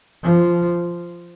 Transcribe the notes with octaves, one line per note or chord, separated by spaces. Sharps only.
F3